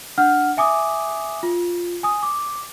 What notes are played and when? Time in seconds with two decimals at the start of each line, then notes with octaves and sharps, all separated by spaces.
0.18 D4 F#5 F6
0.57 E5 G#5 D6 D#6
1.43 F4
2.03 G#5 D#6
2.23 D6